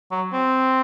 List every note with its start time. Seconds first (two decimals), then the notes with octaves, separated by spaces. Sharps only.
0.12 F#3
0.33 C4